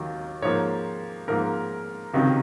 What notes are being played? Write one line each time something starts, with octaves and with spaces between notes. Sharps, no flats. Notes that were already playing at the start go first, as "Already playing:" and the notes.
Already playing: D#2 D#3 F#3
G#2 F3 A#3 C#5
G#2 F3 A#3 A#4
C#2 C3 D#3 F#3